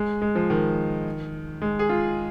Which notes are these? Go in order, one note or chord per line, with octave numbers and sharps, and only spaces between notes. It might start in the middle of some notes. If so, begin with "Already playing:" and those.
Already playing: G#3
G#3
F3
D#3
G#3
G#4
F4